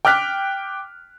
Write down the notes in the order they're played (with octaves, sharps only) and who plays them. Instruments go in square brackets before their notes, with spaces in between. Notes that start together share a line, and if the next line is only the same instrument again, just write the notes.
[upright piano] G5 D6 F6 F#6 B6